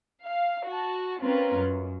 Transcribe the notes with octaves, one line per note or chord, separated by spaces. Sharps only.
F5
F#4 A5
C4 C#4 F4 A#4 B4
F#2